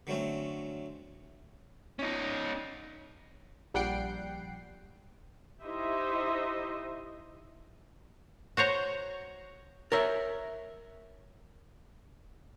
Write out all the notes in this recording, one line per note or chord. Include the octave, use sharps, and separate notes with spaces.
D3 F#3 A3 C4 C#4
C#4 D#4
A#1 G3 F#5 G5 C7 D7
D#4 E4 G4 C5 D#5 E5
F#4 C5 C#5 A#5
A#4 C#5 E5